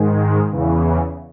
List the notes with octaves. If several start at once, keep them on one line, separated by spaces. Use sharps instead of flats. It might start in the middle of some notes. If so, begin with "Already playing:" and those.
Already playing: G#2 D#3 G#3
E2 C#3 E3